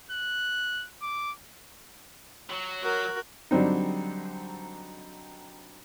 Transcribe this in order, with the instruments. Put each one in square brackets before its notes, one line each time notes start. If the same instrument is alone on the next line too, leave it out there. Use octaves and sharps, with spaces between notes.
[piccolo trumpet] F#6
D6
[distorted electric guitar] F#3
[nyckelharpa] F#4 A#4
[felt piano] D3 F#3 G3 C4 D#4